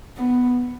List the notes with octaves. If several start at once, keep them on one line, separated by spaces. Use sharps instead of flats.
B3